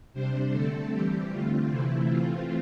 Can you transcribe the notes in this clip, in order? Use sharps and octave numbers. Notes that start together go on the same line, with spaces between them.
C3 G3 D4 C5
D3 A3 C4 A4
E3 G3 C4 G4
D3 A3 C4 F4
C3 E3 A3 C4 E4
E3 A3 C4 F4